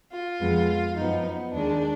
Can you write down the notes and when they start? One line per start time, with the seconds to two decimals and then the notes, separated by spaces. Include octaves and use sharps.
0.12 F4
0.40 F2 F3 G#3 B3
0.96 F#2 F3 B3 D#4
1.24 B3
1.53 D#2 D#3 G#3 D4